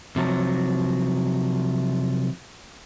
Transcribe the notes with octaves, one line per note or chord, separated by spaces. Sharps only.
C3 F3 F#3